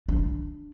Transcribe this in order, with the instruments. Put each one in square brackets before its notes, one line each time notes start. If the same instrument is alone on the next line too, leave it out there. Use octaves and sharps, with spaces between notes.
[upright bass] D4